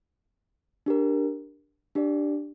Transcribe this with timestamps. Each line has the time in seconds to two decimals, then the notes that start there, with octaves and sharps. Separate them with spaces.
0.86 D4 G4 A#4
1.95 D4 G4 D5